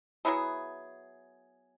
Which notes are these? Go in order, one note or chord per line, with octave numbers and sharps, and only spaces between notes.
F#3 B3 E4 G#4